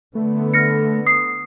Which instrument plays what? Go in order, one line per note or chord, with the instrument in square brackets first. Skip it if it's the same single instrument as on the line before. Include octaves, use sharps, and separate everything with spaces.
[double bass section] D3 B3 [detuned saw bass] A3
[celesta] F6 A#6 C#7
D#6 C7